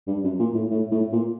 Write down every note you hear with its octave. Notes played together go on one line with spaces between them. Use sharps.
G2
F#2
A#2
A2
A2
A2
A#2